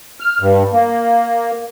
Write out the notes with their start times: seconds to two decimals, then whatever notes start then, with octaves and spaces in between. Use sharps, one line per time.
0.20 F6
0.40 G2
0.73 A#3